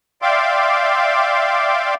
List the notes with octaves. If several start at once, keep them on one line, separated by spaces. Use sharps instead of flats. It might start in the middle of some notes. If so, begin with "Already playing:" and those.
D5 E5 F5 G5 C6 D6